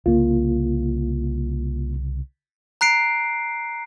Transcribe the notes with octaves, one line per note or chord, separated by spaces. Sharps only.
C2 C#3 A#3 F4
A#5 F#6 C7 D7